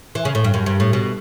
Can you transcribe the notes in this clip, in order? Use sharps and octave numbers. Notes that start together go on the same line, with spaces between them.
E3
C#3
A2
G2
F#2
G2
A2
B2